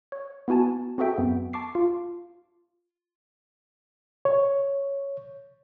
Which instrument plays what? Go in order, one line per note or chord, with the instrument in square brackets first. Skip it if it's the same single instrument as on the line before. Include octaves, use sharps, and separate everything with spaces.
[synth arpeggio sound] C#5
B3 E4 F#4 G#5 A5
C4 F#4 G#4 A4 E5 G5
F#2 B3
A5 C#6 D6 C7
F4
[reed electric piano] C#5